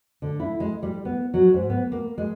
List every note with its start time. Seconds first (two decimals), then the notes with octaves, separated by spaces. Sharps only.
0.22 D3
0.40 E4
0.60 G#3
0.83 G3
1.05 B3
1.34 F#3
1.54 G#2
1.70 B3
1.92 A#3
2.18 G#3